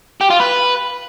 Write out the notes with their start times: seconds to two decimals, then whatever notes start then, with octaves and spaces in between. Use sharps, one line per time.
0.21 G4
0.30 F4
0.40 B4